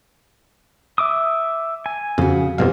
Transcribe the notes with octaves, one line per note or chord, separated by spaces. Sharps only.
E5 D6 D#6
G#5
F2 C#3 F#4
F2 B2 G3 C5 F5